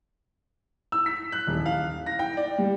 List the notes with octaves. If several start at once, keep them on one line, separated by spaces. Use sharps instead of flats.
E6
B6
F#6
D#1
F5
A#6
G5
D5
G3